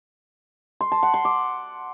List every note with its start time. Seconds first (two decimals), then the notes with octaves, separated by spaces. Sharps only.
0.81 C6
0.92 A5
1.03 F#5
1.14 C6
1.25 D6